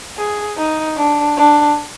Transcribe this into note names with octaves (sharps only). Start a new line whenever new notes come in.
G#4
D#4
D4
D4